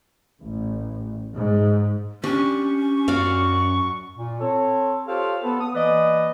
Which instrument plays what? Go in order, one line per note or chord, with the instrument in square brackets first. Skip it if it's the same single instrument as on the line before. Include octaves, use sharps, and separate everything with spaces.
[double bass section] A1
G#2
[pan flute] C#4 [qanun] D4 G4 [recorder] C#6
[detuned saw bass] F#2 [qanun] F#4 D5 F5 [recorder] C#6
[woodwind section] A#2
C4 A4 C#5
F4 G4 A4 C5 C#5 F5
B3 A4 B4
D#6
E3 A#3 B4 D5 D#5